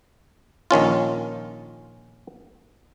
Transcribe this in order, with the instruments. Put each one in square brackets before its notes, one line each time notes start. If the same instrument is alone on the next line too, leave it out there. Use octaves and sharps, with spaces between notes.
[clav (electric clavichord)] A#1 D#3 C#4 F4